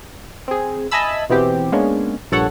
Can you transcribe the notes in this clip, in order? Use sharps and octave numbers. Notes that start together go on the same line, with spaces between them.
C4 G#4
D#5 E5 G#5 A5 B5 E6
B2 E3 B3 C4 G4
G#3 A#3 B3 C#4 D4
A#1 G2 A#2 A4 C#5 F#5